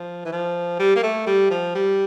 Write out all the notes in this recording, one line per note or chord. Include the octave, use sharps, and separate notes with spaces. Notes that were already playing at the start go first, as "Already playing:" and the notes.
Already playing: F3
E3
F3
G3
A#3
A3
G3
F3
G3